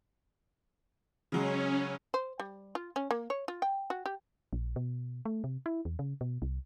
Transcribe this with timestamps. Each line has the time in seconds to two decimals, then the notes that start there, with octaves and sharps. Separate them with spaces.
1.32 C#3 F#3 G#3 C#4
2.14 C5
2.40 G3
2.75 F4
2.96 C#4
3.11 A#3
3.30 C#5
3.48 F4
3.62 G5
3.90 F#4
4.06 G4
4.53 A#1
4.76 B2
5.25 A3
5.44 C3
5.66 E4
5.85 E2
5.99 C#3
6.21 B2
6.42 C2